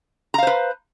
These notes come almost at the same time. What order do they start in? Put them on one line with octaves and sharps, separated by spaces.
A#5 F5 C5 B4